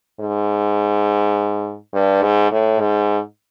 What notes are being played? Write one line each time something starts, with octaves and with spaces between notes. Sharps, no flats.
G#2
G2
G#2
A2
G#2